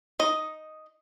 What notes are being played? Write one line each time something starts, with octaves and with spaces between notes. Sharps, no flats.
D#4 D#5